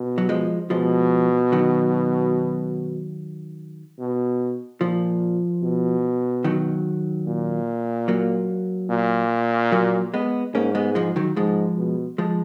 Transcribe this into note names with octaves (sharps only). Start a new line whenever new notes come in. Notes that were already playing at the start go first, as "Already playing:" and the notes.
Already playing: B2
F#3
F3 G#3
B2 F3 G#3
D#3 F#3
B2
A#2 F3
B2
D#3 F#3
A#2
F#3 A#3
A#2
F#3 A#3
G#3 B3
G#2 A#3 C#4
G#3 B3
F3 G#3
D#3 F#3
G#2 F3 G#3
B2
F3 G#3